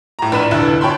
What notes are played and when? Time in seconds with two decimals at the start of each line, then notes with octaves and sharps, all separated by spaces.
0.19 A2 A#5
0.32 A#1 B4 B5 E7
0.51 F1 D2 E4 F#6
0.81 C#5 G5 A5 B5 C6